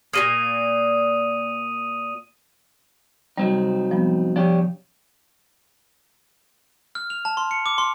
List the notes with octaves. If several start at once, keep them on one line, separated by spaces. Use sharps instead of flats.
A#2 C#3 A#3 D#6 D#7
C3 F#3 G3 C4 D#4
F3 G3 B3
F3 D4 G4 C#5
F6
F7
A5
C6
C#7
D6
C6